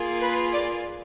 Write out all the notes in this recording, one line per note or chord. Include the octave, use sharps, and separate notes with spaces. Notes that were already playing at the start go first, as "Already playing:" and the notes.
Already playing: A#3 F4 G#4
B4
D5